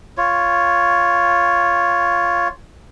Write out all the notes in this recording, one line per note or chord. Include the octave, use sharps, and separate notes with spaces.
F4 C#5